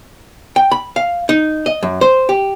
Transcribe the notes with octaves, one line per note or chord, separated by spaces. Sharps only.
G5
B5
F5
D#4
D#5
F#2
C5
G4